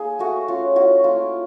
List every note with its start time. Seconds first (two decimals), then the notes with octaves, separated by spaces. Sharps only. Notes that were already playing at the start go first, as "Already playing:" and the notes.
Already playing: A#3 D#4 G#4
0.19 A3 F#4
0.48 C#4 F4
0.76 E4 F#4
1.04 A#3 F4